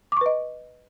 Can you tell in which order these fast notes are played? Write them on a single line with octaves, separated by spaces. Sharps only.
D6 C#6 B4 D#5